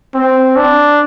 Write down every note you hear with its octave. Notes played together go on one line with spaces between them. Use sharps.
C4
D4